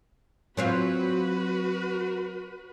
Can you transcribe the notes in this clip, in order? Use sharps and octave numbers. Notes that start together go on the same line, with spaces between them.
F#3 C4 F4 F#4 B4